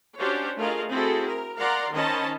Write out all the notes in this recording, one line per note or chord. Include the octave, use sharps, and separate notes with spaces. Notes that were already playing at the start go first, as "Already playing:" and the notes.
C#4 D4 F#4 G4 C5 C#5
A3 F4 G#4 A#4 D#5 F5
C4 E4 F#4 G#4 A4
A#4
A#4 D5 F5 F#5 A#5 C6
D#3 C#4 C5 D#5 A5 B5